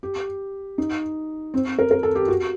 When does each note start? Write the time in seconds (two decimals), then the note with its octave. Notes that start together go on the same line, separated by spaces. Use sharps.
0.03 G4
0.78 D#4
1.54 C4
1.79 A#4
1.91 A#4
2.03 A4
2.15 G4
2.28 F#4